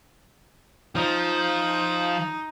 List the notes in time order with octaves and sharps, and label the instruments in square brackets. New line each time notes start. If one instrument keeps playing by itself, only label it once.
[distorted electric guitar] F3 [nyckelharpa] D#4